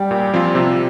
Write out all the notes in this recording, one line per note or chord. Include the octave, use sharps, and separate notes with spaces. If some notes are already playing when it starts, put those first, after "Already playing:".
Already playing: G3 G4
A#2
F3 C4 F4
C3